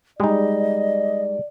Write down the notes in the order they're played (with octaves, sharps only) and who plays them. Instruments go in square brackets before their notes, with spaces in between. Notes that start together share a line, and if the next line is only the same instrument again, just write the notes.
[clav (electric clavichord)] G3 D#4 [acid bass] G#3 [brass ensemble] D5 [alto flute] D#5